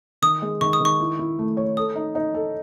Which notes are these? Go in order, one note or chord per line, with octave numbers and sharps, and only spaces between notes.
D#3 D#6
G#3
D#3 C#6
D#6
D#3 C#6
E4
E4
A3
C#5
A4 D#6
D#4
D#4
A4